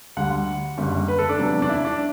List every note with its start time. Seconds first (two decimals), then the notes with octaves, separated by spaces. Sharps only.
0.17 D2 D3 G3 F#5
0.77 F#1 F#2 D3 G3
1.08 B4
1.19 A4
1.29 D4
1.39 E2 C3 F#3
1.62 D4
1.69 E4
1.85 D4